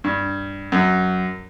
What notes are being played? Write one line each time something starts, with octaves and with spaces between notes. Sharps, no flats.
G2
F#2